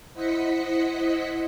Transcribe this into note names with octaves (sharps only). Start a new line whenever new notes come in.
E4 C5 D#5 F#5 B6 C#7